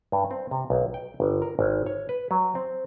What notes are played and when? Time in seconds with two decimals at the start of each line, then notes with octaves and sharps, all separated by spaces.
0.12 G2
0.31 C4
0.51 C3
0.70 B1
0.94 G5
1.20 G1
1.42 A#4
1.59 G#1
1.86 C#5
2.09 B4
2.31 F#3
2.55 C4